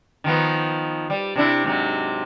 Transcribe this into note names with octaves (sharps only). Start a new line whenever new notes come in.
D#3 F3 B3
G3
C3 D4 E4
G#2 C3 F#3